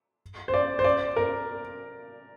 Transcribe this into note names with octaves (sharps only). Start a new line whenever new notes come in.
C5
D5
C5
D5
A#4